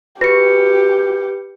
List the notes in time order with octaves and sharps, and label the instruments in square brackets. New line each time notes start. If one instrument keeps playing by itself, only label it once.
[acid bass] F#4 [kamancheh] G4 [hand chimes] B4 C#7